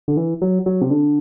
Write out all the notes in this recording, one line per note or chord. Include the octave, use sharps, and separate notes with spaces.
D3
E3
F#3
F#3
C3
D3